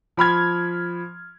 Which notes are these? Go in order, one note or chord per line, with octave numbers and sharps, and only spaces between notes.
F3 B5 F6 G#6